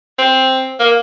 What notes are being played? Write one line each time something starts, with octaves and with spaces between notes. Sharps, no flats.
C4
A#3